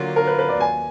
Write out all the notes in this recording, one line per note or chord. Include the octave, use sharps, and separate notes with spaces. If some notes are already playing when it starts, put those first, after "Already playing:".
Already playing: D3 F#3 A#3 F4
A#4
B4
B4
D5
D#2 G#5